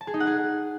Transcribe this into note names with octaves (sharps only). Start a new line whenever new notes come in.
A5
G#4
D#4
F#5
G#4